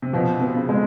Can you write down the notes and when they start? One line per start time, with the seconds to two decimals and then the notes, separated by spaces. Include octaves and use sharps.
0.02 C3
0.13 B2 F3
0.34 C3
0.41 B3
0.56 C#3
0.69 G#3